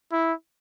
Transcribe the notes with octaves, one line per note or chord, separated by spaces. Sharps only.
E4